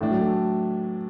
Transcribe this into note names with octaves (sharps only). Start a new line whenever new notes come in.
A2 E3 A3 D4
F#3
A3